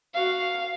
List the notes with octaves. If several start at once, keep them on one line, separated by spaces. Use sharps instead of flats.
F#4 F5